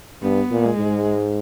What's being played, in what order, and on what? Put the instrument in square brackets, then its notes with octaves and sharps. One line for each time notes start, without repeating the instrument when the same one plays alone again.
[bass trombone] G2 [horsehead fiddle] B3
[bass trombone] A#2
[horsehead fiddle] G#3
[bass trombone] G#2